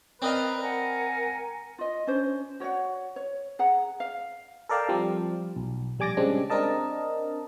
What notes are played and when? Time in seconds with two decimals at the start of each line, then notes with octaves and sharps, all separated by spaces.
0.22 C4 A#4 B4 D5 D#5 F5
0.62 A#4 F#5 G#5 A#5
1.78 F4 D#5
2.07 C#4 D4 C5
2.60 F#4 C#5 D5 F#5
3.16 C#5
3.59 G#4 F#5 A#5
4.00 F5
4.69 A4 A#4 D5 F5 G5 A5
4.89 F3 G3 C4
5.56 B1
5.99 A#1 G3 G#5 D6 A6 A#6
6.17 C#3 G3 G#3 C4 D4
6.50 C4 D4 A#4 D#5 A5